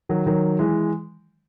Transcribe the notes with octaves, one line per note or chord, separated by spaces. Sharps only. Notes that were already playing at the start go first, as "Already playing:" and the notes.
D#3 F#3
D#3 F#3
E3 G#3